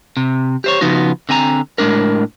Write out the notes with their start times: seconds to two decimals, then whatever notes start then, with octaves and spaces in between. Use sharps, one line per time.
0.17 C3
0.64 G4 C5 C#5
0.81 C#3 F3 B3 D#4 F#4
1.29 D3 C4 G#5 A#5
1.78 A2 G#3 A3 D4 A#4